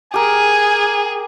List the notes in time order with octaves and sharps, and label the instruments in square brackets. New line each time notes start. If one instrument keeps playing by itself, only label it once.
[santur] G4 A#4 [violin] G#4 [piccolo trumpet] G#5